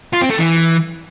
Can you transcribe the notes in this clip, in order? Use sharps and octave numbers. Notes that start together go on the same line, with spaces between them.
F4
C4
A3
E3